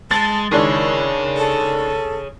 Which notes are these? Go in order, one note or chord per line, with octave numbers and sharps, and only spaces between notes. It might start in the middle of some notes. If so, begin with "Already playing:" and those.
G#3 A5 A6
D#3 G#3 D4 E4 G#4 C#5
A4